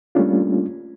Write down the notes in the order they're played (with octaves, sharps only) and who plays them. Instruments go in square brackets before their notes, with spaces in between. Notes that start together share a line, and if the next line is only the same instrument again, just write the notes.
[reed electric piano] G3 A3 A#3 C#4 D4 F4